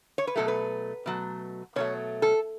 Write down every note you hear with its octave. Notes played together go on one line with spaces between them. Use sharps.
C#5
B4
B2 F#3 A3 A4
B4
B2 F#3 A3
B2 F#3 A3 C#5
A4